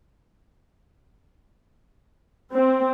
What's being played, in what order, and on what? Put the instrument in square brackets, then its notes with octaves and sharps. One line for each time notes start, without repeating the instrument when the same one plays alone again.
[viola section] C4